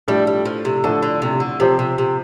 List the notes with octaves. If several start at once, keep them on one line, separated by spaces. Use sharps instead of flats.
A2 F3 G3 A3 D4 A4
G3
F3
C3
A2 D3 F3 A3 D4 A4
D3
C3
D3
C3 F3 C4 G4 C5
C3
C3